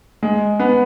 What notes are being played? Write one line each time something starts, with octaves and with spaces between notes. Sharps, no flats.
G#3
B3